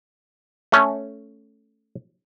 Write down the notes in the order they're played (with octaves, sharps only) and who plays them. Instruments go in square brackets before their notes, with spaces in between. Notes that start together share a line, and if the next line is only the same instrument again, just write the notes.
[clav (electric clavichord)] A3 C#4